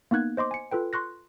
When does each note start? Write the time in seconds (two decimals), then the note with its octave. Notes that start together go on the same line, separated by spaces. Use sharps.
0.11 A#3 B3 D#4 F#6 G#6
0.37 C5 D#5 C6 D6
0.51 G#5 C#7
0.71 F4 A4 B4 G5
0.93 C6 C#6 F#6 A#6